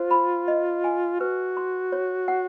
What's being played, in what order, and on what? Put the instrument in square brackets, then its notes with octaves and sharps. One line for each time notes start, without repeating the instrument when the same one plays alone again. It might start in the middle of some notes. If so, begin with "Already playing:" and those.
Already playing: [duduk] F4 [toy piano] C5
[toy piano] B5
D#5
G#5
[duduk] F#4 [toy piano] B4
[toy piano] C6
C#5
F#5